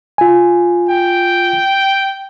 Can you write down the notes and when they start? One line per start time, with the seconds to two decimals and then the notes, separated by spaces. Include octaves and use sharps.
0.18 F4 G#5
0.89 G5